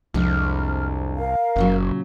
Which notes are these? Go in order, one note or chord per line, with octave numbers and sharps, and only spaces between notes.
C2 F2 G#3 D4 F6
A#4 F5
F#1 A#2 C#3 F#3